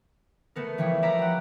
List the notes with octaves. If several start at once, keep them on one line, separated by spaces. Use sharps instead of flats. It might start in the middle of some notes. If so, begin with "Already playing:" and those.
A3 B3 A#4
E3 F3 G3 E4 C#5
A#4 D5 E5 F5 A#5 B5
G4 F#5